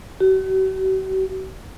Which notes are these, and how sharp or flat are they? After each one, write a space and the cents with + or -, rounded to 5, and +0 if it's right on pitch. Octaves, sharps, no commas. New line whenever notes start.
F#4 +45